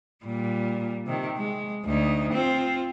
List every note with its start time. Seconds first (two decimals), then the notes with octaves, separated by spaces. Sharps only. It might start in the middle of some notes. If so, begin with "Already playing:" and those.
0.25 A#2 G3
1.06 C3 D#3
1.38 G#3
1.85 D2 D#4
2.32 C4 F4